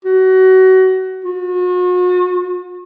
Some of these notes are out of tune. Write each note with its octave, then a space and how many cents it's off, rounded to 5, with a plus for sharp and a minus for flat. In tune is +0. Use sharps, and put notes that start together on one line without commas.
F#4 +25
F#4 -40